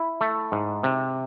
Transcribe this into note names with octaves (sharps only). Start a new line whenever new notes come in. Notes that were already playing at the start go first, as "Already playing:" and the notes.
Already playing: E4
A3
G#2
C3